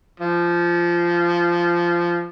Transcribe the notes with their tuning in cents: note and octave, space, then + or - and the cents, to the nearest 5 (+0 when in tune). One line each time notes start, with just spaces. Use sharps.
F3 -15